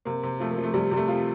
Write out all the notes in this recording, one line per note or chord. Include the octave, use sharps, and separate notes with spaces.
C3 A#3
C3
F3 A3
A#3
F3
A3
C3 G3
C3 G3
A3
F3 F4